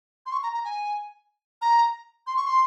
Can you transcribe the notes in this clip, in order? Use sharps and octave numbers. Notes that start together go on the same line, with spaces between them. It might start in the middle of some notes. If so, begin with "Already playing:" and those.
C6
C#6
A#5
A#5
G#5
A#5
C6
C#6
C6